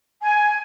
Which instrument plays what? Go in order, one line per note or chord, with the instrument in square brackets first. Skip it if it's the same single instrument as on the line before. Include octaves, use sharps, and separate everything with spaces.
[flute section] G#5